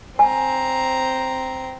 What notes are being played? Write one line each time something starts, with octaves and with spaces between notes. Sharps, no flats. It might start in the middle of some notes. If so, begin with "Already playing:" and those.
C4 G#5 A#5